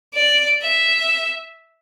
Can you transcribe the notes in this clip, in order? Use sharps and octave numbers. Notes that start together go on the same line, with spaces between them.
D5
E5